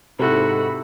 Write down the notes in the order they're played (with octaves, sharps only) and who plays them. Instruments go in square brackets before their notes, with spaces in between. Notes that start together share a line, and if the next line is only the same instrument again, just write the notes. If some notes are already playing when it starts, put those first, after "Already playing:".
[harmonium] G#2 [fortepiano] C3 E4 F#6 [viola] F#4 B5 [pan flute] A4